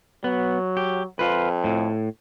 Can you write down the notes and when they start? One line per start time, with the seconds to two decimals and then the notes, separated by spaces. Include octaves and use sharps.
0.24 F#3 B3
0.77 G4
1.19 F2 F4 B4
1.64 A2